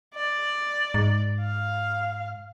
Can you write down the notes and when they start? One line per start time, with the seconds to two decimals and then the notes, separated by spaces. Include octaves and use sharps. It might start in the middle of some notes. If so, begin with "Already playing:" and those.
0.15 D5
0.94 G#2
1.41 F5